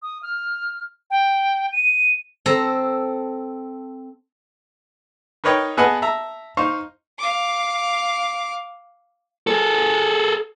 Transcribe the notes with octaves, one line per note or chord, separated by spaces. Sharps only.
D#6
F6
G5
D#7
C4 A4 A#5
D#4 A#4 B4 C#5 D#5 G5
B3 G#4 B4 D#5 F#5 A5
E5 A5 A#5
D#4 C5 F5 C#6
F5 D6
G#4 A4